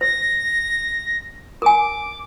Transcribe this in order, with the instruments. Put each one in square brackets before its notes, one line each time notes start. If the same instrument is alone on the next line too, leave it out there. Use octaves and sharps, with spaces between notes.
[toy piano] C5 [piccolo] A#6
[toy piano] A#4 G#5 [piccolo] D6